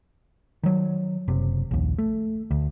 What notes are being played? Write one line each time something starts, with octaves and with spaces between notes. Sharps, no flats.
D#3 F#3
F#1 C3
A#1 D#2
A3
D2